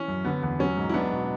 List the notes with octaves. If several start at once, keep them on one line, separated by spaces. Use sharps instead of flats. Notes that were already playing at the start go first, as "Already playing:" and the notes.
Already playing: E3 C#4
F#2
D3 B3
E2 B3
F#3 C#4
G#2
E4
F#3 B3 D4
B2